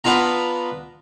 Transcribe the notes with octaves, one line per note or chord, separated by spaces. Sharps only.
B3 D4 F4 A#5